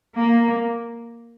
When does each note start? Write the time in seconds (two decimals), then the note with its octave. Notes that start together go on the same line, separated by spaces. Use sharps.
0.15 A#3